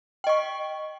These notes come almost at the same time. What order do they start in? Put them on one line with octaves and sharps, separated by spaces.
G5 D#5 C#6